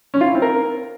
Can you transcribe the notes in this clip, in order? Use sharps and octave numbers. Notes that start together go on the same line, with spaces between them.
C#4
F4
E4
C4
A#4